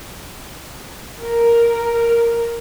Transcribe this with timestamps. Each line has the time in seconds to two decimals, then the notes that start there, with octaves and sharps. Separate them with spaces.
1.22 A#4